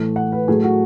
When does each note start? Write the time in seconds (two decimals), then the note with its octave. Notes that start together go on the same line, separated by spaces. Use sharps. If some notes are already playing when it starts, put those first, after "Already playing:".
Already playing: A2 E3 A3
0.16 F#5
0.32 B4
0.48 A2 F#3 A3 G#4
0.64 F#4